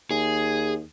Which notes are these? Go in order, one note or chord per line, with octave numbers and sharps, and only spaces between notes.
D#2 G#4